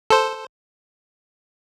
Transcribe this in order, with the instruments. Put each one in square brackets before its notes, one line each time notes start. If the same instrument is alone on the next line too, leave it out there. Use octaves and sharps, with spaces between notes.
[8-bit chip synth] A4 C5